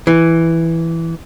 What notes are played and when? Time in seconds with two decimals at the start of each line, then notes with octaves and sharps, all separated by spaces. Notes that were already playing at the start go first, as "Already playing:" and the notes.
0.07 E3